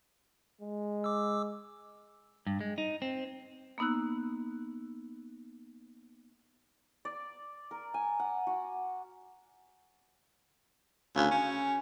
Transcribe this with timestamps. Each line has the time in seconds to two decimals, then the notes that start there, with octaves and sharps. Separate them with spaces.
0.62 G#3
1.04 D6 E6
2.47 G2
2.61 G#3
2.78 D#4
3.02 C4
3.78 A#3 B3 D#4 E6 F#6
7.05 D5
7.71 A#4
7.94 G#5
8.20 F#5
8.47 F#4
11.16 D2 C#3 G#5
11.31 C#4